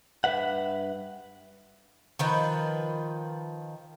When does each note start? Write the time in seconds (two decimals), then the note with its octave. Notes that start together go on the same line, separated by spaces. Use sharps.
0.24 G2 E3 B4 E5 F#5
2.19 D#3 F3 B4